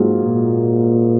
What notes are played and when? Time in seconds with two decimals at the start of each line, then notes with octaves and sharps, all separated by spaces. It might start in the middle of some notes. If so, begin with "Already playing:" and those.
Already playing: G#2 F#3 A#3 F4 G#4
0.24 A#2